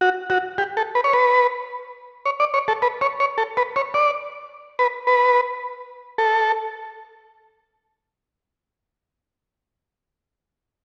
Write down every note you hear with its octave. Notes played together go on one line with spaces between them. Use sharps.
F#4
F#4
G4
A4
B4
C#5
B4
C#5
D5
C#5
A4
B4
C#5
C#5
A4
B4
C#5
D5
B4
B4
A4